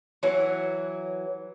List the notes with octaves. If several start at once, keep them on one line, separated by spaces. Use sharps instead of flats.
E3 F#3